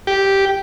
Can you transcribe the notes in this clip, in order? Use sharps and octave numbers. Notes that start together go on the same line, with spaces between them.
G4